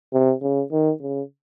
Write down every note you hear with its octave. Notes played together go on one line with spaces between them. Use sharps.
C3
C#3
D#3
C#3